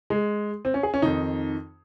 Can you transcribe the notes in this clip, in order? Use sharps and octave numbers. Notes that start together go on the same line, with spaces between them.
G#3
C4
C#4
G#4
C#4
F2 D#3 D#4